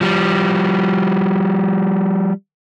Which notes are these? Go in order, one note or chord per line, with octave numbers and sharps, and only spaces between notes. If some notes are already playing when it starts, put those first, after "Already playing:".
F3 G3